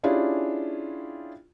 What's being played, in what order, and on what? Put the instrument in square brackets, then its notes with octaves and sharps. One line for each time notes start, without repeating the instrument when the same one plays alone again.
[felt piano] C#4 D4 E4 F4 G4 G#4